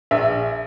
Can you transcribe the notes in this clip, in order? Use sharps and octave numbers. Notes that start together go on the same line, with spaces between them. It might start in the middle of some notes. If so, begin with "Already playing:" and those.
A#1 E5